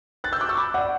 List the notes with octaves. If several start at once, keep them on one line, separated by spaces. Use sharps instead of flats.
F#6 A6
E6 G6
D6 F#6
C#6 E6
B5 D6
D5 F#5